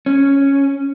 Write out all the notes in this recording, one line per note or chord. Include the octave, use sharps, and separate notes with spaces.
C#4